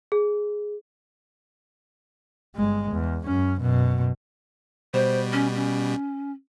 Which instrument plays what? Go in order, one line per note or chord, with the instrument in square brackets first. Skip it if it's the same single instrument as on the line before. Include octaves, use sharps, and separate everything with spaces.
[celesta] G#4
[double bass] G1 G#3
E2
F#2 C#4
F#2 B2
[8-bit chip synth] B2 G3 [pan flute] C5
[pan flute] C#4
C#4